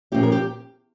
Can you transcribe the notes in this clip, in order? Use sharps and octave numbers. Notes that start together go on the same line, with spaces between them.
A#2 F3 A#3 C#4 G4
A#4
G4